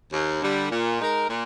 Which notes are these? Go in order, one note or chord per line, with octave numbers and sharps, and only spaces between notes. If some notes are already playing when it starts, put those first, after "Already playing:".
D#2
D3 G3
A#2
G#3 D#4 A#4
A#2